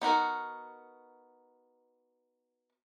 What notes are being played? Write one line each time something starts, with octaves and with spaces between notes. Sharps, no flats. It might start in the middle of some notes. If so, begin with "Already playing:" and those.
B3 D#4 F#4 A#4